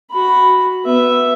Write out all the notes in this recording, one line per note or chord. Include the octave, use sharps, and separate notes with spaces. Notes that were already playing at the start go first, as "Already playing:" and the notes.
F#4 B5
B3 E5